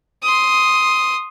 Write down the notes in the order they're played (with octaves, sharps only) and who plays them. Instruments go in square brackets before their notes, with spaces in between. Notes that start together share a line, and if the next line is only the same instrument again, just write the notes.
[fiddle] C6 D#6